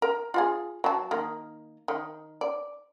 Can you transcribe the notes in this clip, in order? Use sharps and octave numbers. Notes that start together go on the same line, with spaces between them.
A#4
F4 F#4 G#4
F#3 A5
D#3 A#3
D#3
D5